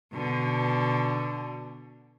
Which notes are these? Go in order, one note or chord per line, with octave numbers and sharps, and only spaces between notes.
B2 D3